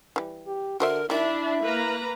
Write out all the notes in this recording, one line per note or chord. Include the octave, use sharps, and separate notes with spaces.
E3 G3
G4
D3 F#4 A#4 C5 E5
D#3 G3 D4 E4 E5
A#3 B4 A#5